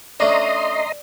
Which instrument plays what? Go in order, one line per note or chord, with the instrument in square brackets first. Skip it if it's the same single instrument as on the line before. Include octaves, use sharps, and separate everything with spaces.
[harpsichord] A3 C#4 D4 [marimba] D5 [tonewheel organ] D#5 A#5 C6